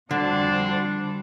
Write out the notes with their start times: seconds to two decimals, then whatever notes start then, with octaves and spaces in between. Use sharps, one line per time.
0.11 F2 D3 G3 C4 D4 F#4 C5